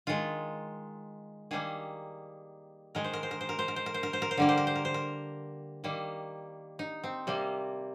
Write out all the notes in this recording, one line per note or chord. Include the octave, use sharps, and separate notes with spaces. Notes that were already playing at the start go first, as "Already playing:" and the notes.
D#3 G#3 F4
D#3 G3 A#3 G#4
D#3 G#3 A#4
C5
A#4
C5
A#4
C5
A#4
C5
A#4
C5
A#4
C5
A#4
C5
A#4
C5
D3 G3 A#3 A#4
C5
A#4
C5
A#4
C5
A#4
D#3 G3 A#3
D#4
C4
C3 G3 A#3